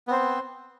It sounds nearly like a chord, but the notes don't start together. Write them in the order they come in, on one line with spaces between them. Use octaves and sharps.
B3 C4 C5